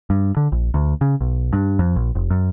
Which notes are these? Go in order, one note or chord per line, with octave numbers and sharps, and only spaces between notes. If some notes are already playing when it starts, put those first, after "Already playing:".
G2
D3
A#1
D2
C#3
B1
G2
F2
A#1
F1
F#2